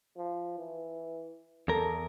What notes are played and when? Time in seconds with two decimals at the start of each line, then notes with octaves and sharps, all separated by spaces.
0.17 F3
0.58 E3
1.68 E2 A4 A#4